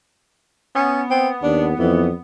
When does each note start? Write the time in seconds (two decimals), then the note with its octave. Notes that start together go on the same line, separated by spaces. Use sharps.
0.75 B3 C#4
1.10 C4
1.43 D#2 D4
1.79 F2 E3